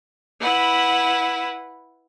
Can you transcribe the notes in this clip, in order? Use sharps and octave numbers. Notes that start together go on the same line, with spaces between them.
E4 B4 F#5